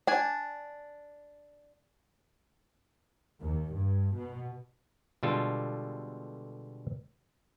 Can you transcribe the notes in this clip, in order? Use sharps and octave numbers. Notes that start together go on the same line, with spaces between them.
D4 G#5
D#2
G2
B2
B2 D3 G3 G#3 F4 A4